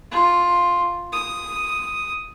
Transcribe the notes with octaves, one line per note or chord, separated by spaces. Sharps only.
F4
D#6